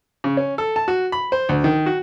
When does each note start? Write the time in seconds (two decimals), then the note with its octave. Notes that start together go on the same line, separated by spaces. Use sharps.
0.24 C#3
0.37 C#4
0.58 A4
0.76 A5
0.88 F#4
1.12 B5
1.32 C5
1.49 D2
1.64 D#3
1.86 F#4